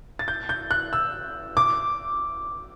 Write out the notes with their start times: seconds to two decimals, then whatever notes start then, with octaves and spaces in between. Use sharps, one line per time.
0.19 A6
0.28 G6
0.49 G6
0.71 F#6
0.93 E6
1.57 D6